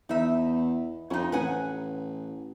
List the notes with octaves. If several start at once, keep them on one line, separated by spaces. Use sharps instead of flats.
E2 D#4 E5
F2 C#4 D#4
A1 B4 F#5 G#5